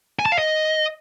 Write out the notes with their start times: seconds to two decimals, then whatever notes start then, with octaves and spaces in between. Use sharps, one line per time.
0.19 G#5
0.26 A5
0.32 F5
0.38 D#5